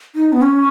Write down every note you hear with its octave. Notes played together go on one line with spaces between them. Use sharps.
D#4
B3
C#4